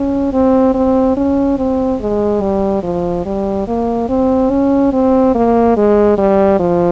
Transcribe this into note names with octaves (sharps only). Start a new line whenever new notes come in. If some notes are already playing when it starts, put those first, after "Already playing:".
Already playing: C#4
C4
C4
C#4
C4
G#3
G3
F3
G3
A#3
C4
C#4
C4
A#3
G#3
G3
F3